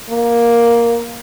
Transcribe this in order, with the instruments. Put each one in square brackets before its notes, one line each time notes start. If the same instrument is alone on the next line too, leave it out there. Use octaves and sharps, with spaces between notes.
[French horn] A#3